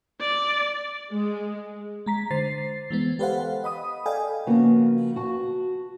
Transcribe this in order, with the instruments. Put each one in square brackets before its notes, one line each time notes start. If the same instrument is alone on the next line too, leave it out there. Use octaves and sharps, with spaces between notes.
[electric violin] D5
[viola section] G#3
[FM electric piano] G#3 A#5 B6
D3 C5 A6 C7
E3 G#3 B3
G4 A4 B4 C5 F5 F#5
D#5 B5 D#6
A4 D5 D#5 F5 G5 G#5
[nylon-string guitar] C#3 F3 A#3 B3 F#4
F#4 A5